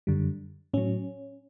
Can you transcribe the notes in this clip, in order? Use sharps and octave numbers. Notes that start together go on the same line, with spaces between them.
F#2 D3 G3
A2 F#3 C#4